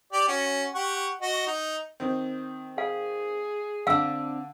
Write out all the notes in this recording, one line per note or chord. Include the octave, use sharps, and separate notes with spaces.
G4 D5
C#4 F#4
G4 F#5 C#6
F#4 D#5
D#4
D#3 C4
G#4 F5
D3 C4 D4 F5 E6